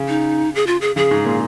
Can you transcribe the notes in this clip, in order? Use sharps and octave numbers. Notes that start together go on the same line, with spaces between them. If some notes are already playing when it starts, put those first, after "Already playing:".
Already playing: C#3
D#4
G#4
F4
G#4
C#3 G#4
G#2
A#2